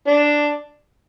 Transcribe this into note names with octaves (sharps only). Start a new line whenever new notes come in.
D4